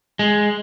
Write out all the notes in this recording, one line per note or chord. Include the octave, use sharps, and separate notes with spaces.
G#3